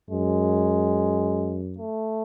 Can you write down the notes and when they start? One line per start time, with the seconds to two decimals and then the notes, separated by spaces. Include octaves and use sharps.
0.10 F#2 G#3
1.78 A3